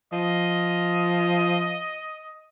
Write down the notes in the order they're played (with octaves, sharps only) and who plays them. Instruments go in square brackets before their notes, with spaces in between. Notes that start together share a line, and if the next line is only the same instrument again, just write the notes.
[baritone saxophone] F3 [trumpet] D#5